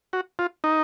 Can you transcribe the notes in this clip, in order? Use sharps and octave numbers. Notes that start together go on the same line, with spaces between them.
F#4
F4
D#4